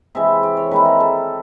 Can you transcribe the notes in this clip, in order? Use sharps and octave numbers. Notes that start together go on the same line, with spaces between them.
C3 E3 G#3 E5
D5
C#5
D#3 G#3 C4 E4 B4
A#4
A4